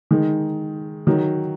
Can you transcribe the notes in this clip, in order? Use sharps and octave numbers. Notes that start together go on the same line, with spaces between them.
D#3 G#3 D#4
D#3 F#3 D#4